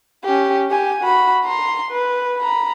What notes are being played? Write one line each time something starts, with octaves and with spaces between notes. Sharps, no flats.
C#4 G4
G4 G#5
F#4 B5
A#5 C6
B4
A#5 B5